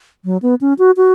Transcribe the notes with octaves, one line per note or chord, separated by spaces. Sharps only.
F#3
B3
C#4
F#4
F#4